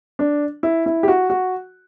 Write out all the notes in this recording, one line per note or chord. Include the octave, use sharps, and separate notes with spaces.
D4
E4
E4
G4
F#4
F#4